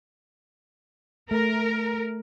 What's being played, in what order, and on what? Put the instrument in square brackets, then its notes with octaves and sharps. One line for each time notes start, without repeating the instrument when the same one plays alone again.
[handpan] A3 [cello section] A#4